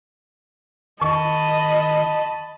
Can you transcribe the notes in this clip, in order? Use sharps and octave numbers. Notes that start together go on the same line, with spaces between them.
D#3 D#5 A5 B5 C#6